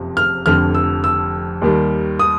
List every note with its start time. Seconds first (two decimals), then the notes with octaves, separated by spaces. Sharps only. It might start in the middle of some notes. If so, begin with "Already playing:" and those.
Already playing: F#1 F2 C3 F3
0.17 F6
0.46 F1 F2 D3 F6
0.75 E6
1.04 E6
1.61 D#2 D#3 G3
2.19 D#6